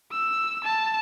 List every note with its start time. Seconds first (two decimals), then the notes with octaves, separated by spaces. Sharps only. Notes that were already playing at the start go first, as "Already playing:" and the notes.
0.12 E6
0.64 A5